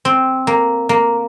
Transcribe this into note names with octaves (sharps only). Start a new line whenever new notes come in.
C4
A#3
A#3